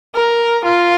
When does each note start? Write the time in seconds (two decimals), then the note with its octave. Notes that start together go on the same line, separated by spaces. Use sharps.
0.15 A#4
0.65 F4